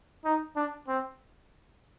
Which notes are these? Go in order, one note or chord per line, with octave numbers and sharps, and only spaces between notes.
D#4
D4
C4